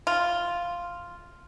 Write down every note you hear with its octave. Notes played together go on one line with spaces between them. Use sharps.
F4